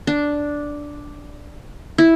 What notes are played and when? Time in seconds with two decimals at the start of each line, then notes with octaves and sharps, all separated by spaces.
0.07 D4
1.98 E4